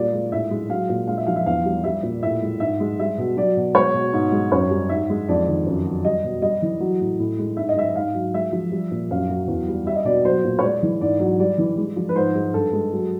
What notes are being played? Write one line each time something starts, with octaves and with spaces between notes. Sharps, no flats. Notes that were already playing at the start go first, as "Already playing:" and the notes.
Already playing: A#2 G3 D5
G#3
A2 E5
G#3
F#3 F5
A#2
G#3 F5
E5
F3 F5
E5
E2 F5
G3
G3 E5
A#2
A2 E5
G#3
G#2 E5
G#3
G3 E5
B2
F#3 D5
B2
G#3 C#5
B2
G#2
G#3
F#2 C#5
G3
G#2 E5
G#3
F2 D5
D#3
F#2
F#3
G3 D#5
B2
G3 D#5
E3
F#3
A2
A2
G#3
G#2 E5
D#5
G#3 E5
G#2 F5
F#3
G#3 E5
F3
G3
A#2
F#2 F5
F#3
E2
G3
G3 E5
D#5
B2 D5
F#3 C5
A#2
C#5
G#3 D5
E3
G#2 D5
F#3
G3 D5
E3
G#3
F3
B4
G#2 C5
G#3
G2 A4
G#3
F#3